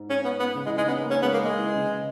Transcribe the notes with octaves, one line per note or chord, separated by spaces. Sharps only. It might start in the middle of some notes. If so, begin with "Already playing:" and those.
Already playing: G#2
C#4
B3
B3
C#3
E3 G#3
G#3 D#4
B3 C#4
A#3
C#4
G#3 B3
A#3
G#3
E3
C#3